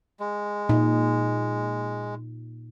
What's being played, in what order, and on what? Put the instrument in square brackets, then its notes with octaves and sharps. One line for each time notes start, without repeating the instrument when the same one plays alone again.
[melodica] G#3
[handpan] A#2 D#4